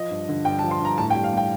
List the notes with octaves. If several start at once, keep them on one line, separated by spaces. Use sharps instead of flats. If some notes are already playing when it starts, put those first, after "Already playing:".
Already playing: F3 D#5
G2
D3
G2 G5
A5
F3
C6
G2 A#5
A2 A5
G5
G3
F5
G3 G5